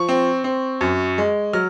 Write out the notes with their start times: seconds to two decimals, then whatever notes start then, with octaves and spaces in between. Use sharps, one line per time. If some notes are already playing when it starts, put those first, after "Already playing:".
Already playing: F3 C#6
0.09 C4
0.44 C4
0.81 F#2
1.18 G#3
1.53 F#3 F6